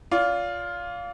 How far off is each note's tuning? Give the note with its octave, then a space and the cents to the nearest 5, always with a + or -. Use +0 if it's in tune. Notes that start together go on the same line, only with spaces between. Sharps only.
F4 +5 D5 -35